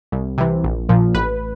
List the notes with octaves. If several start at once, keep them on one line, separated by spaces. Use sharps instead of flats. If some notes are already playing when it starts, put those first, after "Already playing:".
C2
C3 E3
A#1
A#2 F3
A1 B4